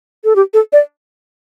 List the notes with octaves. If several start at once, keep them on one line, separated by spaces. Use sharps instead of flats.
A4
G4
A4
D5